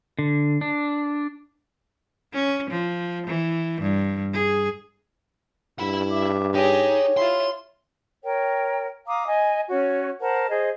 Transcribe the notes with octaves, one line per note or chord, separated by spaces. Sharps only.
D3
D4
C#4
F3
E3
G2
G#4
G2 E4 B5
E5 D6
D#4 G4 G#4 C#5
E4 F4 C6
A#4 C#5 G5
F5 A#5 D6 D#6
D#5 G#5
C#4 F#4 C#5
A#4 C5 F#5 A5
G#4 C5 D#5